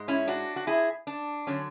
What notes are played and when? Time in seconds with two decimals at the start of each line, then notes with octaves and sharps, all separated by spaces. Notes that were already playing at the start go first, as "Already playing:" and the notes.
Already playing: G#2 G#3
0.08 C#4 E4
0.28 D4 F#4
0.56 F#4
0.67 E4 G#4
1.07 D4
1.47 D3 F#3 C#4